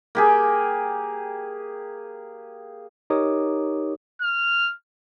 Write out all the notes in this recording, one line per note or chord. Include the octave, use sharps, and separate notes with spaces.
A#3 G4 G#4
D#4 G4 A#4 C#5 D6 D#6
F6